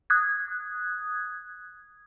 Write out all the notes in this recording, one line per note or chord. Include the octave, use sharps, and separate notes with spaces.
D#6 F#6 G#6